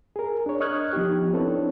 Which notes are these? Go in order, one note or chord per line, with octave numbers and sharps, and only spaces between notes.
G#4 A#4
D4 C#5
D#5 C#6 D#6 F6 F#6 G#6
F3 B3 D#4 G4
C4 D4 E4 A4 B4 C#5